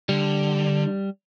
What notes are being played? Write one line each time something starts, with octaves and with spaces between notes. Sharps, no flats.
D3 G3